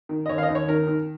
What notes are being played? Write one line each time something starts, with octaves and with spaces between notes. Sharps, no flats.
D#3
D#5
D#2 C#5
F5
D#5
D#2
C#5
D#3 A#4
D#3